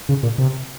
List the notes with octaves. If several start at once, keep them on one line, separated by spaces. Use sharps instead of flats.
C#3
A#2
C3